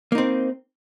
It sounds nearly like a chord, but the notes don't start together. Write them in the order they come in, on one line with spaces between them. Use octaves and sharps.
A#3 D#4 C4